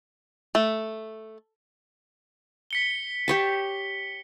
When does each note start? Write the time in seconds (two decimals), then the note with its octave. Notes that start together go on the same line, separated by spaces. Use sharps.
0.55 A3
2.71 B6 C#7 G7
3.28 G4 C#5 A5